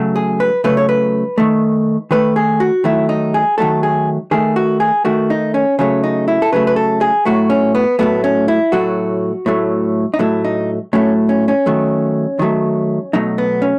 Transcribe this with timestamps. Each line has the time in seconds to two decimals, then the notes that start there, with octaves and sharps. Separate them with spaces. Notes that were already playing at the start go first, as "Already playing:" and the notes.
Already playing: C#3 F#3 A3
0.16 G#4
0.40 B4
0.64 C#3 F#3 A3 B4
0.77 C#5
0.89 B4
1.38 D#3 A3
2.11 D#3 A3 B4
2.36 G#4
2.60 F#4
2.84 D#3 F#3 A3 E4
3.09 D#4
3.34 G#4
3.58 D#3 F#3 A3 A4
3.83 G#4
4.31 D#3 A3 G#4
4.56 F#4
4.80 G#4
5.05 D#3 A3 F#4
5.30 D#4
5.54 C#4
5.79 C#3 F#3 A3 C#4
6.04 D#4
6.28 E4
6.42 A4
6.52 C#3 F#3 A3 B4
6.67 B4
6.76 A4
7.01 G#4
7.25 A2 F#3 A3 F#4
7.50 C#4
7.75 B3
7.99 A2 F#3 A3 B3
8.24 C#4
8.48 E4
8.72 A2 F#3 A3 F#4
9.46 A2 F#3 A3
10.14 D#4
10.19 A2 F#3 A3 E4
10.44 D#4
10.93 A2 F#3 A3 C#4
11.29 C#4
11.48 C#4
11.66 D#3 F#3 A3
12.39 D#3 F#3 A3
13.13 B2 F#3 A3 D#4
13.38 B3
13.62 C#4